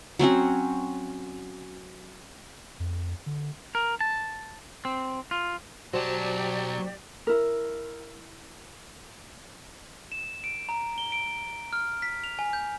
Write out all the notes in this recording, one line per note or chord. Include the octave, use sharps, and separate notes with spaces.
F#3 C4 C#4 F#4
F2
D3
A#4
A5
C4
F4
B1 F#3 F#4 G4 C5 D5 A5
E4 A#4
E7
D7
A#5
G7
D7
F6
B6
F7
G#5
G6